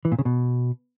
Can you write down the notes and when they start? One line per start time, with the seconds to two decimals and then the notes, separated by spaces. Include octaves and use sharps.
0.05 E3
0.12 A#2
0.19 C#3
0.25 B2